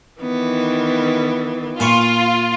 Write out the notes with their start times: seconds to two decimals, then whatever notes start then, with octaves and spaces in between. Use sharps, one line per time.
0.20 D#3 E3 B3
1.80 A#2 F4 B5 C#6